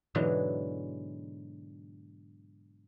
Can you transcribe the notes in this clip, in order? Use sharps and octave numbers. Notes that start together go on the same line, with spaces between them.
G#2 B2 D3 E3 F#3 G#3